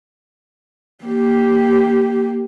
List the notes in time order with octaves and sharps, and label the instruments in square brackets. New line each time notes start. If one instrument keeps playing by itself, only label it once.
[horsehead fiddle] A#3 G4